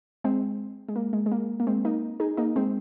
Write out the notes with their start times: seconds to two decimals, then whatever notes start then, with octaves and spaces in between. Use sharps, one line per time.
0.24 G#3 C4
0.89 G#3
0.96 A#3
1.13 G#3
1.26 G#3
1.32 A#3
1.60 A#3
1.67 G#3 C4
1.85 A#3 D#4
2.20 D#4 G#4
2.37 A#3 D#4
2.56 G#3 C4